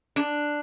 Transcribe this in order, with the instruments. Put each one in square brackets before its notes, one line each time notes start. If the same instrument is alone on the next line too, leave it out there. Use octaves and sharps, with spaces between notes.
[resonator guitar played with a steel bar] D4